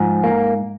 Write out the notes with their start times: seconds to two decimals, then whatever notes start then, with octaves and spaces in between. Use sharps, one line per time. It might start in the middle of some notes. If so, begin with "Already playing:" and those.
Already playing: G#2 F3
0.24 A#3